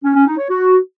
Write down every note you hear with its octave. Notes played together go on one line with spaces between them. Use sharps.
C#4
C#4
D#4
C#5
F#4